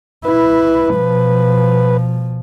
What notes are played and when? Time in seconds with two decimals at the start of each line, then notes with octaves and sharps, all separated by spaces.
0.25 E4 B4
0.95 B2 F3